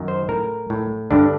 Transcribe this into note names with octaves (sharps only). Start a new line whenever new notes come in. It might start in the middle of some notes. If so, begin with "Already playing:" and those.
Already playing: F#2 D#3
C5
A2 A#4
A2
G2 D3 D4